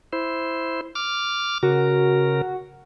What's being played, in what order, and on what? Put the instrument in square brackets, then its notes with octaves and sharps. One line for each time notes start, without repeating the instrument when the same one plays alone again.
[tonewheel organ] E4 C5
D6 F6
[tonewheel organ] C#3 A#4 [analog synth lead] F#4